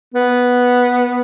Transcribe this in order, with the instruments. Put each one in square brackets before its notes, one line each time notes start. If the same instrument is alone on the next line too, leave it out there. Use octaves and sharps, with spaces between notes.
[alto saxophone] B3